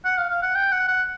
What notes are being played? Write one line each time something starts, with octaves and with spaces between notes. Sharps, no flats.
F#5
F5
F5
F#5
G5
F#5
F#5